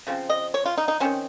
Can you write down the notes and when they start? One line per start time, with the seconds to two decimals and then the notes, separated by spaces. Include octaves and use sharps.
0.07 C#3 F3 C4
0.29 D#5
0.54 C#5
0.66 F4
0.78 D#4
0.88 D#4
1.00 D#3 F#3 C4 C#4